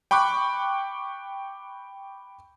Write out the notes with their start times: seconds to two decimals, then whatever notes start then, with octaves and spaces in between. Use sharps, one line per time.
0.11 G5 B5 C#6 D6 F#6